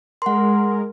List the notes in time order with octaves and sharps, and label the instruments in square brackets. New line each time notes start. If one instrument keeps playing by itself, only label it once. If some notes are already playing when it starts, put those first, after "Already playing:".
[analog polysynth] G#3 A#4 [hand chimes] F#5 C6